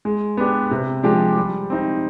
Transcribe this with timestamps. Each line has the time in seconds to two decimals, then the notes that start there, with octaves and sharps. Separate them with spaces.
0.05 G#3
0.37 B3 D4 G4
0.71 C3
1.03 F3 G#3 D4 G4
1.37 G3
1.70 C4 D#4